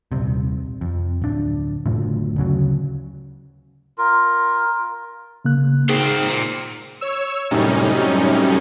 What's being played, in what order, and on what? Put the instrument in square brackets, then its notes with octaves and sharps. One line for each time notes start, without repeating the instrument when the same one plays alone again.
[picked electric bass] D#1 C2 C3
F2
D1 D4
F#1 D2 A2 F3
D2 C#3 F#3
[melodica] F4 A#4
[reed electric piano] C#3 A#3 F#6
[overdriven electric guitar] D#3 C4 [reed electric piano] G#4
[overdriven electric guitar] A#2
[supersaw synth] C#5 E6
F#2 A2 C3 G3 C#4 D#4